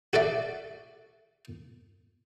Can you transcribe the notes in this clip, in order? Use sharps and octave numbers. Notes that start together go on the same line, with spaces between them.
F#4 A4 D5 E5